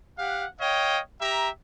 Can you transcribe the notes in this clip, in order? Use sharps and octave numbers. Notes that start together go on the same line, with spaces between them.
G4 F5 F#5
C#5 D#5 F5 G5
G4 E5 A#5